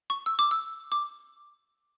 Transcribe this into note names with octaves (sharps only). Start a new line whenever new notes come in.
C#6
E6
D6
E6
D6